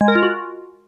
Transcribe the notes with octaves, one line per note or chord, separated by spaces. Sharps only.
G#3
A#4
F4
F#4